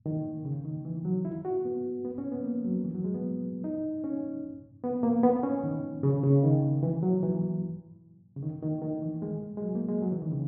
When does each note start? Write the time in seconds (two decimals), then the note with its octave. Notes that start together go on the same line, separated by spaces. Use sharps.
0.06 D#3
0.45 C#3
0.65 D#3
0.85 E3
1.05 F#3
1.25 E4
1.45 F#4
1.65 B3
2.05 B3
2.18 C#4
2.32 B3
2.44 A#3
2.64 F#3
2.84 E3
2.95 F#3
3.04 G#3
3.14 B3
3.64 D#4
4.04 C#4
4.84 B3
5.03 A#3
5.23 B3
5.43 C#4
5.64 D#3
6.03 C#3
6.23 C#3
6.43 D#3
6.83 E3
7.03 F#3
7.23 E3
8.36 C#3
8.42 D#3
8.63 D#3
8.82 D#3
9.02 E3
9.22 G#3
9.57 G#3
9.62 F#3
9.75 A#3
9.88 G#3
10.02 F#3
10.12 E3
10.22 D#3
10.32 C#3